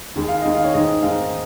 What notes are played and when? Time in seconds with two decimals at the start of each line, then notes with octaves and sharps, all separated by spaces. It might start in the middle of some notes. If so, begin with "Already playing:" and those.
0.16 D#2 D#3 G#3
0.28 F5
0.41 D#2 D#3 G#3 D#5
0.54 F5
0.64 C#5
0.74 G#2 D#3 G#3 D#5
1.02 G#2 D#3 G#3 F5